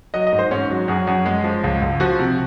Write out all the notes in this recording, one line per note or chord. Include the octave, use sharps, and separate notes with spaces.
F#3 D#5
D#5
G#2
C5
G#2 C#4
F#3
F#2 G#4
F#2 G#4
G#3
F3
C#2
C#2
F3 F#4
C3